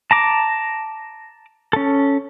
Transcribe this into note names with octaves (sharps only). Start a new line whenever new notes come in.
A5 A#5 D6
C#4 A4